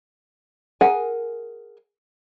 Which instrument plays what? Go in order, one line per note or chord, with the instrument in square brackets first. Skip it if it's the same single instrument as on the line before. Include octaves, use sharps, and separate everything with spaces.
[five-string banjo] G#4 A#4 F#5 G#5